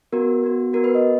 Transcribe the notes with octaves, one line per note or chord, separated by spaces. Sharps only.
B3 F#4 A#4
B3 F#4
B3 F#4 A#4
B4
D#5
B3